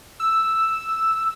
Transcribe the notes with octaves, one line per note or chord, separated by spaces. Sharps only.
E6